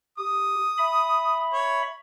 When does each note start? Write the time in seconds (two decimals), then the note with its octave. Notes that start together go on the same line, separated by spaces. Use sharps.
0.18 G4 D#6
0.78 E5 B5
1.53 C#5